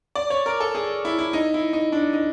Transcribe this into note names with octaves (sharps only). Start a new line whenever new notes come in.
D5
C#5
A#4
A4
G#4
E4
E4
D#4
E4
D#4
D4
D#4